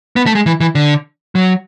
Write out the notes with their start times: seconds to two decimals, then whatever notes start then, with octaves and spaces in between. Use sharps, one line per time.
0.16 B3
0.26 A3
0.35 G#3
0.46 E3
0.60 E3
0.75 D3
1.35 F#3